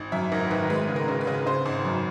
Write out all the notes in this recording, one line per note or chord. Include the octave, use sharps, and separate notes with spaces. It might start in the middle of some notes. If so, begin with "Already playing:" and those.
Already playing: G#1
F#2 E5
G#1 A#4
D#3 B4
G#3 B4
C#3
A#4
C#3
B4
C#3
C#3 C5
G#1
F#2